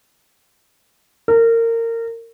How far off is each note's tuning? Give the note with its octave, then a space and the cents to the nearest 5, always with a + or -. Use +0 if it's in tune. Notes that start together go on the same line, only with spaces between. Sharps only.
A#4 -25